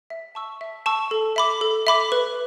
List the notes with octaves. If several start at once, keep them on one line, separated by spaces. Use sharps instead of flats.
E5
A5 C#6 E6
E5
A5 C#6 E6
A4
E5 B5 D6
A4
E5 B5 D6
B4